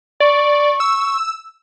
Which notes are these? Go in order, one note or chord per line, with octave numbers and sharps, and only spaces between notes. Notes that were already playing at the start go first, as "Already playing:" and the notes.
D5 C#6
E6